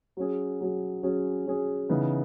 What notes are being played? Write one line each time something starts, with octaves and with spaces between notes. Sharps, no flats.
F#3 C#4 G#4
F#3 C#4 G#4
F#3 C#4 G#4
F#3 C#4 G#4
C#3 E3 B3 D#4